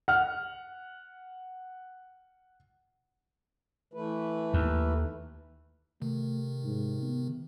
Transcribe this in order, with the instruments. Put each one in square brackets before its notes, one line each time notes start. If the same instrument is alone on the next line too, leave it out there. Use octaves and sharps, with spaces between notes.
[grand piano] F#5 F6
[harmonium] E3 A3 B4
[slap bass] D#2
[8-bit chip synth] C3 D#3 [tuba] A3
[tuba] G#2
B3